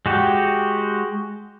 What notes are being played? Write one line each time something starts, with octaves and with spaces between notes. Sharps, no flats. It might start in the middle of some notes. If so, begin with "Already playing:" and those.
G#3 F#4 G4